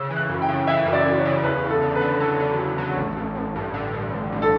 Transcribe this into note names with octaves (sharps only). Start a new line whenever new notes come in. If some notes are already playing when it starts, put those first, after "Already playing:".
Already playing: C#3 E6
E3
F#6
F#2
G5
C#3
E3 E5
F#2
D5
F#2
C#5
C#3
E2 B4
E2
A4
D3
B4
D3
F#3 A4
D3
E2
F#3
A1
A1
A1
G2
D3
G2
A1
A1
A4